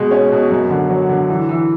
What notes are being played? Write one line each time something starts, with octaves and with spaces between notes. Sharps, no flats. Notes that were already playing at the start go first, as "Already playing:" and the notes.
Already playing: B2 G#3
C#4
B2
F#2
D3
F#3
D3
E3
E3